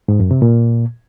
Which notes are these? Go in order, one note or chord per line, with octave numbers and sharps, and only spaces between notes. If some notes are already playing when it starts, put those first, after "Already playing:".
G#2
F#2
C3
A#2